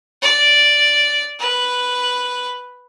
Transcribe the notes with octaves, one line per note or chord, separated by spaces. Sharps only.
D5
B4